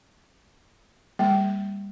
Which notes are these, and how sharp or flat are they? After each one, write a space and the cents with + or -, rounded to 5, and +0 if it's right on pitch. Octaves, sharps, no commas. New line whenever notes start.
G3 +25 A#3 -5 G5 -25